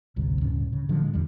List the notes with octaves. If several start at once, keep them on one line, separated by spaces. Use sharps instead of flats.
G#1 D2 C3 G3
D1 G2 C#3 C#4
C#3
A2 D3 F3 F#3
G#3
E2 D#3 G3